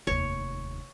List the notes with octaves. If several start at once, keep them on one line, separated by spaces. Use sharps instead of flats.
F1 D#2 C#5